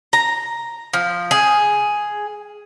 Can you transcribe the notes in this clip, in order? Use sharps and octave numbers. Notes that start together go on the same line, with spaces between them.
A#5
F3
G#4